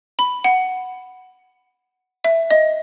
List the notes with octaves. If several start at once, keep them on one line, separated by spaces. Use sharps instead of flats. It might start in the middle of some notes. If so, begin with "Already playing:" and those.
B5
F#5
E5
D#5